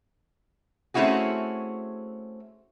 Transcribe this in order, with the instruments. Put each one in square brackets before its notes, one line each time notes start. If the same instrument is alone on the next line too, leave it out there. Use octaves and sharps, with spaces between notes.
[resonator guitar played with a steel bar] A3 C4 C#4 E4 F#4 G#4